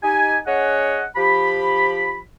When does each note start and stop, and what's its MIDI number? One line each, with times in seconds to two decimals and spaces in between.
0.03 0.39 63
0.03 0.39 67
0.03 0.39 80
0.47 1.04 61
0.47 1.04 68
0.47 1.04 73
0.47 1.04 75
0.47 1.04 78
1.17 2.20 53
1.17 2.20 67
1.17 2.20 83